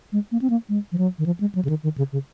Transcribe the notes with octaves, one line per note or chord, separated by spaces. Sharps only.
G#3
A#3
C4
A#3
G#3
F3
F#3
D#3
F3
G#3
F#3
C#3
D#3
D#3
C#3
C#3